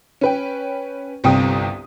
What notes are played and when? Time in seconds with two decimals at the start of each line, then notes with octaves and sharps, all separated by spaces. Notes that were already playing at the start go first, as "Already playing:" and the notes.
0.21 C#4 B4 G5
1.24 G1 C2 C3 G5 D#6